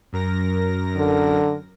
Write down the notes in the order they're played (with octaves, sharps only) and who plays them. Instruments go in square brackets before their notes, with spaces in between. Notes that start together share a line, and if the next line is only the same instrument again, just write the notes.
[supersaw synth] F#2 A#4 A#6
[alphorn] D3